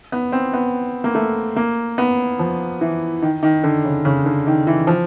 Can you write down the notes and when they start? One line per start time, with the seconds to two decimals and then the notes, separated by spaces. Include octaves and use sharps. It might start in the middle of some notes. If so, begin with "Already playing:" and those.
0.12 B3
0.32 C4
0.53 B3
1.04 A#3
1.15 A3
1.56 A#3
1.98 B3
2.39 F3
2.81 E3
3.22 D#3
3.43 D#3
3.64 D3
3.84 C#3
4.05 C#3
4.26 D3
4.47 D#3
4.67 E3
4.87 F3